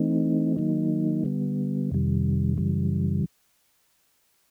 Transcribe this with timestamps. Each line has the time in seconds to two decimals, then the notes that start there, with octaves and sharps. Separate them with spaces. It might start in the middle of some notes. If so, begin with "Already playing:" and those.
Already playing: E3 A3 C4 D#4
0.56 D#3 F#3 A#3 D#4
1.24 D3 G3 B3
1.91 F2 C3 D#3 G3
2.58 F#2 C#3 E3 G3